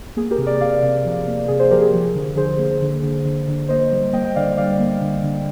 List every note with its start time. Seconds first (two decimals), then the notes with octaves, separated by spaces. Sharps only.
0.17 A#3 G#4
0.31 G4 A#4
0.38 C3
0.46 A#4 D5
0.60 C3 D5 F5
0.83 C3
1.05 F3
1.27 A#3
1.48 C3 G#4
1.59 G#4 C5
1.71 F3 G4 A#4
1.82 G#4
1.94 F3
2.15 D3
2.37 D3 G#4 C5
2.59 A#3
2.82 D3
3.03 D3
3.25 D3
3.48 D3
3.69 A#3 C5 D#5
3.92 G3
4.13 A#3 D#5 G5
4.24 D#5 G5
4.36 D3 D5 F5
4.57 G3 D5 F5
4.80 A#3
5.01 D3
5.23 D3